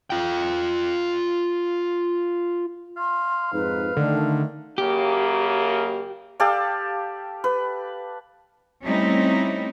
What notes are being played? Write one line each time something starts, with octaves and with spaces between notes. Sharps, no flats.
F4 G5
F5 C6
F2 G#2 D#4 B4
D3 D#3 A3
F#2 C#3 A#3 G4
G4 A4 D5 F5
B4
G3 A3 C4 C#4 D#4 E4